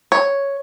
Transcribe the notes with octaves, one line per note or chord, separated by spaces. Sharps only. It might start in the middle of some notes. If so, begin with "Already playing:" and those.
C#5